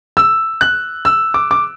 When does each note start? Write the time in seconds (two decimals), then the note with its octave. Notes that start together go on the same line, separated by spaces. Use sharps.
0.17 E6
0.61 F#6
1.05 E6
1.34 D6
1.51 D6